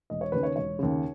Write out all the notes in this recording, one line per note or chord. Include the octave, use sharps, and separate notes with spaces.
E1 D#5
C#5
D#2 C#3 B4
C#5
E1 C#5
D#2 C#3